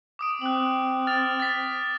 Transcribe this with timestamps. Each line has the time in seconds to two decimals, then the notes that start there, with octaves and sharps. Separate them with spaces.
0.19 D6 D#6 D7
0.42 C4 F#6 F#7
1.07 F6 A6 F7
1.40 A6 B6